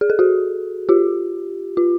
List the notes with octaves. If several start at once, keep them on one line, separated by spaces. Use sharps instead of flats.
G#4
A4
F#4 G#4
F4 G4
F4